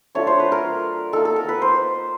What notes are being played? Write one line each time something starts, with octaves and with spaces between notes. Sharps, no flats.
F#3 A3 D4 F4 C#5
C5
B4
A#4
A#3 D#4 A4
A4
A#4
B4
C5